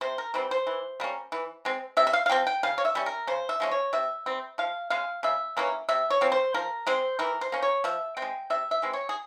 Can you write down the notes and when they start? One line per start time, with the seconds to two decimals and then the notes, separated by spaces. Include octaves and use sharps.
0.01 C3 C5
0.18 A#4
0.34 E3 G3 C4 C5
0.51 C5
0.67 E3
1.00 G3 A#3 C#4
1.32 E3
1.65 G#3 C4
1.97 C3 E5
2.07 E5
2.13 F5
2.26 F5
2.30 F3 C4 G5
2.47 G5
2.63 C#3 F5
2.78 C#5
2.85 E5
2.95 G3 C#4
3.06 A#4
3.27 C#3 C5
3.49 E5
3.60 F3 G#3 C#4
3.71 C#5
3.93 C3 E5
4.26 G3 C4
4.58 F3 F5
4.90 G#3 C#4 F5
5.23 C#3 E5
5.57 E3 A#3 C#4
5.89 C3 E5
6.10 C#5
6.21 F3 C4
6.32 C5
6.54 F3 A#4
6.87 G#3 C4 C5
7.19 E3 A#4
7.41 C5
7.52 A#3 C#4
7.62 C#5
7.84 F3 E5
8.17 C4 G5
8.22 G#3
8.50 C3 E5
8.71 E5
8.82 E3 G#3 C4
8.93 C#5
9.09 G#4